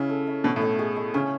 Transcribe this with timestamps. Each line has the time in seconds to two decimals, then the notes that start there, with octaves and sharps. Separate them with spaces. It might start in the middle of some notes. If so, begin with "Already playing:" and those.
Already playing: C#3 C#4 E4
0.09 A4
0.27 E5
0.44 B2 C#4
0.56 A2
0.62 A3
0.79 G#4
0.96 A3
1.14 C#3 C#4